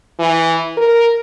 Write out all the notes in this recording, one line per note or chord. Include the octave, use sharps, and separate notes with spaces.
E3
A#4